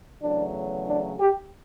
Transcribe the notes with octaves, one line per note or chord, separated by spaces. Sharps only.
E2 C#3 F#3 A3 D4
D4
G4